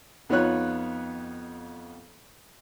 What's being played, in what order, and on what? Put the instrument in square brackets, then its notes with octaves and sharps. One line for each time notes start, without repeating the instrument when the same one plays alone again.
[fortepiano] F2 B3 D#4 F4 C#5 F#6